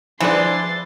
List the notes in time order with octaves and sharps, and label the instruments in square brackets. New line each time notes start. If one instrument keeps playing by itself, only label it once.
[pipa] E3 [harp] F3 E6 [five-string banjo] D4 G#4 C5 [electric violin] C6 A6